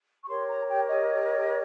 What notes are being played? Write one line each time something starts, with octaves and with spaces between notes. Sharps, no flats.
C#6
G4 A#4 C#5 C6
A#5
G5
D#5